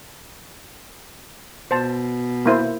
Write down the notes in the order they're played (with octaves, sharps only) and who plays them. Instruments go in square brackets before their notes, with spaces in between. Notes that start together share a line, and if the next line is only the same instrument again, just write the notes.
[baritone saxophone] B2 [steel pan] C5 A5
[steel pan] A#3 E4 C5